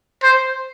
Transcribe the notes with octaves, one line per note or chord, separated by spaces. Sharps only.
C5